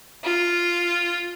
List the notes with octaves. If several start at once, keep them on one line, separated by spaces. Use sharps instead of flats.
F4